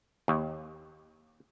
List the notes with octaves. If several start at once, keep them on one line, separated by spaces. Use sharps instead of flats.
D#2